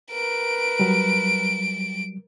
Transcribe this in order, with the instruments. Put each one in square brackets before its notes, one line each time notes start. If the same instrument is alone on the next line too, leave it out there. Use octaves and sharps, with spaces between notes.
[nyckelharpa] A#4 B4 [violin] D7
[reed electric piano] F#3 G3